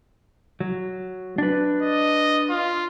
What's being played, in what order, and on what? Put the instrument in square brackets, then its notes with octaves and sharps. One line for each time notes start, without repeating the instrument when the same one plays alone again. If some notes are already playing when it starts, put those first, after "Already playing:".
[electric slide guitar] F#3
D4 B4
[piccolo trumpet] D#5
F4